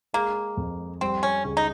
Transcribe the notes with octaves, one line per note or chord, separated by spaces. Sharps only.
G#3 A#3
F2
G3 C4
C#4
C#2
D#4